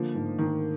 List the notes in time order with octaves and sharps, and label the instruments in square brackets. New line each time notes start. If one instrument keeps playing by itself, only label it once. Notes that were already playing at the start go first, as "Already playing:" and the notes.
Already playing: [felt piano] D3 A#3 [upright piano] F3
[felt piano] G#2
[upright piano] D#3 [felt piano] A#3